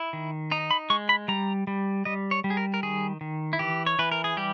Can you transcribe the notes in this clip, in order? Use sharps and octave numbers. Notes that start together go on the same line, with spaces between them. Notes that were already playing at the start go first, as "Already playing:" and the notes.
Already playing: E4
D#3
D#4 A#5
B5
G#3 C#6
B5
G3 A#5
G3
G3 D#5
C#5
G3
G#4
A#4
A#4
D#3 G#4
D#3
E4
E3 G4
C#5
E3 B4
A#4
G#4
G3 G4